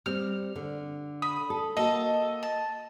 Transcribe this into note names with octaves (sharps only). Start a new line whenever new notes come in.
G3 C4 F6
D3
B5 D#6
A4
A#3 F#4 A4 D#5
A5